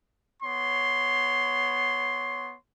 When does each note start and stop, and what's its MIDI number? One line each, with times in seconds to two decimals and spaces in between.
0.43 2.55 59
0.43 2.55 73
0.43 2.55 84